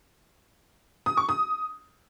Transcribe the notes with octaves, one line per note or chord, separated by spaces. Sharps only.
D#6
C#6
D#6